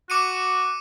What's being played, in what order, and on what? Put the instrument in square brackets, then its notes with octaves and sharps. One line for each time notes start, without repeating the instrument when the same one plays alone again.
[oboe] F#4 [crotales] D6 C#7 D#7